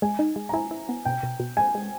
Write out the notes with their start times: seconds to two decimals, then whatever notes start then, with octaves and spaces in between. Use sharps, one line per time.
0.02 G#3 G#5
0.19 D#4
0.36 G#3
0.49 A#5
0.53 E4 G#5
0.71 E4
0.89 B3
1.05 B2 G5
1.23 B2
1.40 B2
1.57 G#3 G#5
1.75 G#3